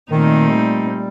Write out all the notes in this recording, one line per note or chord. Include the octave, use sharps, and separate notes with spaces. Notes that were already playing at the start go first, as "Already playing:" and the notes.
A#2 D#3 A3 C4 D#4
G3